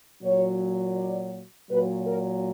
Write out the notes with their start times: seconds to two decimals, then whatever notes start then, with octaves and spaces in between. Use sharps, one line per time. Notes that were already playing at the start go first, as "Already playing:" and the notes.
0.23 A#2 F#3 C#5
0.97 D5
1.69 A#2 F#3 B4
2.06 A#4